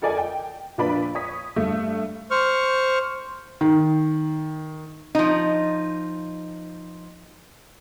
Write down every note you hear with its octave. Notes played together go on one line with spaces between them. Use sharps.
F4 A4 A#4 D5 D#5 G#5
G5
A#2 F3 D4 B4 D5 B5
C#5 D#6 B6
G2 A3
C5 C#6 F6
D#3
F3 D#4